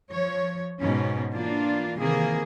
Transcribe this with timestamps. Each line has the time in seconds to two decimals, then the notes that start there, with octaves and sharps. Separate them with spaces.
0.11 F3 C#5
0.81 G#2 B2 C#4
1.32 E3 A#3 D4 F4
1.97 C3 D#3 E3 A#3 G#4